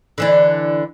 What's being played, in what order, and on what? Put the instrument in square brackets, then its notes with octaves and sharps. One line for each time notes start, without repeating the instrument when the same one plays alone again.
[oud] D3 E3 D4